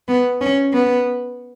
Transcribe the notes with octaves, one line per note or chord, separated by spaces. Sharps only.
B3
C#4
B3